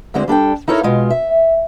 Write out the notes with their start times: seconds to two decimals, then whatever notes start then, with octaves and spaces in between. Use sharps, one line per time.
0.14 D2 D3 G#3 C4 C5
0.28 G3 D4 A4 G5
0.68 D#4 E4 A4 A#4 C#5
0.83 B2 G#3 F4
1.11 E5